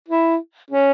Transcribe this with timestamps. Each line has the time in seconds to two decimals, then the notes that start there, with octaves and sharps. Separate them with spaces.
0.08 E4
0.70 C#4